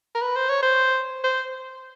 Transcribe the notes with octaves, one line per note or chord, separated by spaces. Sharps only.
A#4
B4
C5
C#5
C5
C5